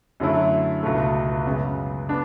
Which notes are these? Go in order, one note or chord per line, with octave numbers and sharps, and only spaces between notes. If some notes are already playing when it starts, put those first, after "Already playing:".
F#2 D3 F#3 A3 E4
C#2 B2 A3
F#2 C#3 G#3 B3
B3 D4